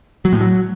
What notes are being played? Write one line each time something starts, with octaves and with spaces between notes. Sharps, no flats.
F#3
A2
F#3